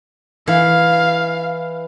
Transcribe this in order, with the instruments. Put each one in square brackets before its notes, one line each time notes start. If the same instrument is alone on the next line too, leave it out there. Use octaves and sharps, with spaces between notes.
[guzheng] E3 [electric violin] F5